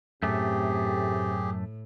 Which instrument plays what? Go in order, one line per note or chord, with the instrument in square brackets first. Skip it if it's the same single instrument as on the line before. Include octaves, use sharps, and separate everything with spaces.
[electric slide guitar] F#2 A3 [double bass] A2 [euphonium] C3 [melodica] G4 G#4